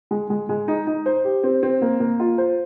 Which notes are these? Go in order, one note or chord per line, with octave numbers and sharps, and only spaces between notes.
G#3
G#3
G#3
D#4
D#4
C5
G4
C4
C4
A#3
A#3
F4
C5